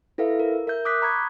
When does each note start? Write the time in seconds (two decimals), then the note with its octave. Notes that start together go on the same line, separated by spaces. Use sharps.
0.18 E4 A4 B4 E5 F5
0.40 A#4
0.67 A#4 E5 G6
0.85 D6 D#6 F#6 G6 B6
1.02 A#5 B5 C#6 D#6 G#6